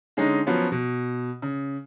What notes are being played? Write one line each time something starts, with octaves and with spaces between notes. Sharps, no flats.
D3 G#3 C#4 D#4
F3 F#3 B3 C#4
B2
C#3